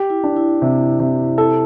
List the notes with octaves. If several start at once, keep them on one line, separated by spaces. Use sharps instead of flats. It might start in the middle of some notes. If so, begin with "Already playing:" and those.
Already playing: G4
E4
D4
E4
C3
C3
E4 A4